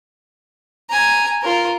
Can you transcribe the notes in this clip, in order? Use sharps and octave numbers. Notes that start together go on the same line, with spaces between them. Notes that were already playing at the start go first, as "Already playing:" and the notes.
G#5 A#5
F4 A#4